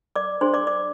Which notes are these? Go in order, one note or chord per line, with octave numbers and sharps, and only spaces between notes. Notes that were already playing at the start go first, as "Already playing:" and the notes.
D5 D6
D4 G#4 C5 C6
D5 D6
D5 D6